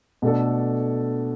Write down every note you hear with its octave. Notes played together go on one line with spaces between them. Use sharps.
B2 A3 D4 A4